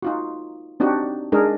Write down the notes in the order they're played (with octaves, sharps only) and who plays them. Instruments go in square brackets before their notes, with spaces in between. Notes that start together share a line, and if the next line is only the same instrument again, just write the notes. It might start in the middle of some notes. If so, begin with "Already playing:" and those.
[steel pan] D#4 F4 F#4
C4 D4 D#4 F#4 G4
G#3 D4 D#4 G#4 A#4